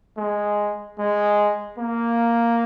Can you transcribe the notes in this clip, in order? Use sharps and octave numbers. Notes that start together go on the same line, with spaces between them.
G#3
G#3
A#3